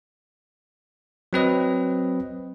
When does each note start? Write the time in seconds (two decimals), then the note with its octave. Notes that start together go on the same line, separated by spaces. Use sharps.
1.33 F#3 C4 B4 D#5